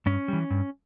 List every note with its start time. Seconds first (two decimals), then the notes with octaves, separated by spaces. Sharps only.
0.06 G2 C#4
0.28 E3 G3
0.50 G2